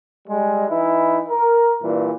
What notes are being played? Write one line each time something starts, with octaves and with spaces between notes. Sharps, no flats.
G3 G#3
E3 D#4 E4
A#4
G2 A#2 E3